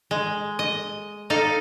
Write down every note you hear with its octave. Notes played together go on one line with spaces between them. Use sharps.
G#3
D#5
D#4 A4 F5